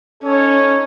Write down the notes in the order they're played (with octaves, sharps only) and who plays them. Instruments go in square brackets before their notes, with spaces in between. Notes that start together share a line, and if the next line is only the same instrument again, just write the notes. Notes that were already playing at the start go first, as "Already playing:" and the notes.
[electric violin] C#4 [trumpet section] D#4 A4 C#5